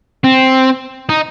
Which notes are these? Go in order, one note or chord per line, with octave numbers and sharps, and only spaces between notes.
C4
D#4